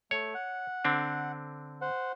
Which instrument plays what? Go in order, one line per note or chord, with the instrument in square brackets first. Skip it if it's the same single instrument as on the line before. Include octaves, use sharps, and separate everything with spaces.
[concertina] A3 [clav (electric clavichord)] C#5
[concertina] F#5
[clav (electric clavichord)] D3 C4 D4
[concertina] C5 F#5